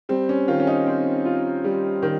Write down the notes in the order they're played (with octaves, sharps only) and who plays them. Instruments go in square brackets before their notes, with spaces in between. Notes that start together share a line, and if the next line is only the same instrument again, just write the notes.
[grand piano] G3 [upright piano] C4
[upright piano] C#4
[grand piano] D#3 [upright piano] F4
[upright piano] C#4
D#4
[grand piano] C4
F4
G3
D#3